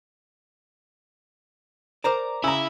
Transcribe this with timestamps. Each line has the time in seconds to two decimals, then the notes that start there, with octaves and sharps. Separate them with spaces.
2.04 A#4 C5 D5 A#5 D6
2.44 C#3 E4 G#5 A#5 B5 E6